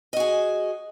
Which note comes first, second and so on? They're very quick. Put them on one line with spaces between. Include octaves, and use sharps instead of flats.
D#5 F#4 G#4